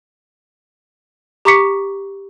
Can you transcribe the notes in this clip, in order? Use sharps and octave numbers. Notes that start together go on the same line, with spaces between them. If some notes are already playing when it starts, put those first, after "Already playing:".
G4 A#5 C#6 D6 B6 C#7